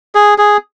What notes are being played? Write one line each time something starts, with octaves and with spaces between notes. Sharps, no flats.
G#4
G#4